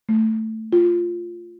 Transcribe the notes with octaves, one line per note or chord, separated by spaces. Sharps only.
A3
F4